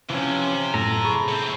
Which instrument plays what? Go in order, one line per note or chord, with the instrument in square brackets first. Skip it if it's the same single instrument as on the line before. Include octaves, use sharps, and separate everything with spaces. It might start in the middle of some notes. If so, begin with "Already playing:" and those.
[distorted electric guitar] C3 [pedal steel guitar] E3 F3 C#4
[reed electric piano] F#2 A2 [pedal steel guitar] A4 A#5
[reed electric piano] G#4 B5 C#6
[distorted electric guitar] A2 C4